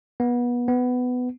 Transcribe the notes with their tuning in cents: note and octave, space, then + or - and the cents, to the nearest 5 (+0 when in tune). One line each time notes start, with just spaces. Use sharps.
B3 -25
B3 +15